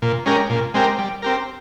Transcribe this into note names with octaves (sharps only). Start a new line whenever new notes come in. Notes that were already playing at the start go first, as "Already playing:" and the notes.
A#2
G#3 C#4 G4 A#4
A#2
G#3 C4 G4 A#4
G3
C4 G4 A#4